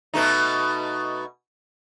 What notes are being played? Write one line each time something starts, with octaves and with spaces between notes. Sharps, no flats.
B2 A3 D#4